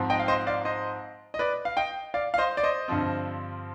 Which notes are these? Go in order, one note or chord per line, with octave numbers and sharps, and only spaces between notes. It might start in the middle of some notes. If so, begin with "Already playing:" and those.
Already playing: G#2 F3 C4
D#5 G5
F5
C5 D#5
D5 F5
C5 D#5
D#5
B4 D5
F5
D#5 G5
D5 F5
F5
C5 D#5
D5
C5 D#5
G2 D3 F3 C4